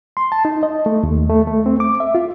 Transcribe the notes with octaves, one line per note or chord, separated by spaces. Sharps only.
C6
A5
D#4
D#5
A3
D#2
A3
A3
C4
D6
E5
F4